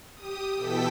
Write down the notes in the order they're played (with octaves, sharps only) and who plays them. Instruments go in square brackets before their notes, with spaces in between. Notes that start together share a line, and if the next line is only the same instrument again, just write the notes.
[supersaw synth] G4 D#6
B2 E3 A4 G5 E6 B6